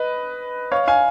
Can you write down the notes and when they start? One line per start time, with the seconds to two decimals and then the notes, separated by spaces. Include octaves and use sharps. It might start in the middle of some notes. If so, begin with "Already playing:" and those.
Already playing: B4 D#5
0.72 C#5 F5
0.88 F5 G#5